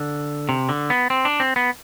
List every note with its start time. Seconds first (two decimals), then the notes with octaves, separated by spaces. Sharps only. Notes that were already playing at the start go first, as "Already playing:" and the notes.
Already playing: D3
0.49 C3
0.69 D3
0.90 B3
1.10 C4
1.25 D4
1.40 C4
1.56 B3